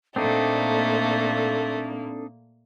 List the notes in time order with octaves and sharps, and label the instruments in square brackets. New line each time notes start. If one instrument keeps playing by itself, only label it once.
[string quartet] A#2 A#3 [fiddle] A3 [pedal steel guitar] C4 D4 D#4 [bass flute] A4